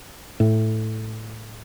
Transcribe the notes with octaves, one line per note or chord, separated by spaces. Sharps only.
A2